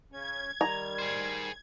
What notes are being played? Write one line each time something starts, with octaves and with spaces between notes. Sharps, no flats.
C#3 C#4 G#6
D#3 G3 A#5
G#4 C5